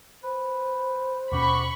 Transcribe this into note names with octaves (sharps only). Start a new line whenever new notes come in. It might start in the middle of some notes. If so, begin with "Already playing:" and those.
B4 C5
D#2 B2 C#4 F#4 G4 B5 C#6